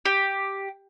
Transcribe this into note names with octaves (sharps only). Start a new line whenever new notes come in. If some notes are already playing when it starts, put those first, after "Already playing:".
G4